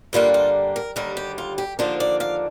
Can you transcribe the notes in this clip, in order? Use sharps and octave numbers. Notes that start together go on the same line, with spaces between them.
G2 D3 G3 A#3 D4 F4
F4
A#4
D#2 D3 G3 A#4
G4
F4
G4
D#2 D3 F3 A#3 D4 C5
D5
F5